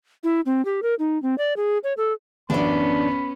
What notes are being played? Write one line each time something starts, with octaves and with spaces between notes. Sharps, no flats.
E4
C4
G4
A#4
D#4
C4
D5
G#4
C#5
A4
A1 F#2 B3 C#4 D4 D5 B5